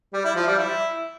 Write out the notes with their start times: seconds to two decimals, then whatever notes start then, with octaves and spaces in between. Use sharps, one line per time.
0.13 G3
0.25 E4
0.36 F3
0.47 G3
0.58 E4